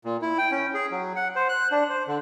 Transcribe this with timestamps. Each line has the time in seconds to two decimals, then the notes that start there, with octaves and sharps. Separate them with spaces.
0.05 A#2
0.22 E4
0.38 G5
0.51 C#4
0.74 G#4
0.91 F#3
1.16 F#5
1.36 C5
1.49 F#6
1.71 D4
1.89 C5
2.07 D3